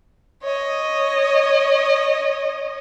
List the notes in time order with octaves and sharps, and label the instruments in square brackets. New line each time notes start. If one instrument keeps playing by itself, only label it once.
[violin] C#5 D#5